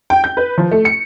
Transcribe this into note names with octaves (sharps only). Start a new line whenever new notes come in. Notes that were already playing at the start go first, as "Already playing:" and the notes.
G5
G6
B4
F3
A3
C#7